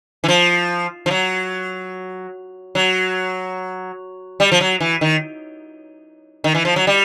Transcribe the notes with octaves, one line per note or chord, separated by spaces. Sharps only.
E3
F3
F3
F#3
F#3
G3
F3
F#3
E3
D#3
D#3
E3
F3
F#3
G3